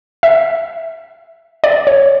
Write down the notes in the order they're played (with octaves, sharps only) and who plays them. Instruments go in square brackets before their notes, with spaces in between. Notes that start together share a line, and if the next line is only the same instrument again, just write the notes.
[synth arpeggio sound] E5
D5
C#5